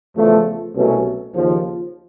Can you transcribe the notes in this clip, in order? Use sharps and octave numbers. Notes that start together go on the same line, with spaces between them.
E2 C#3 F3 A3
C2 B2 F#3 A3 C#4
D#2 C#3 F3